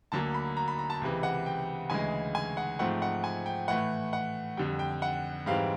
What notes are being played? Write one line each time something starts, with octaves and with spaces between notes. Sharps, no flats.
D2 D3 F#3 A#3 A5
B5
A#5
B5
A#5
A5
C#2 C3 E3
F#5
G5
D2 C#3 E3 G#3 G#5
G#5
F#5
G#2 F3 A3 C4 F#5
F#5
G#5
G5
A2 E3 A3 F#5
F#5
F2 D3 G3 G5
G5
F#5
G#2 E3 G3 C4 F5